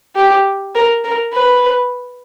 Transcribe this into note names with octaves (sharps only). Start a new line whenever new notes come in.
G4
A#4
A#4
B4